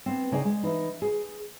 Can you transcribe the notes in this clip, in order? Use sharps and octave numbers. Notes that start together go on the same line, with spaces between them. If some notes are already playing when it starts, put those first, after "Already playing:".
B3 C4
C#3 D#4 G#4 D5 G5
G#3
E3 D#4
G#4